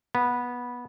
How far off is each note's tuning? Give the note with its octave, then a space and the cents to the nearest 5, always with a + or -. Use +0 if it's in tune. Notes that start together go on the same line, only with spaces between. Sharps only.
B3 -15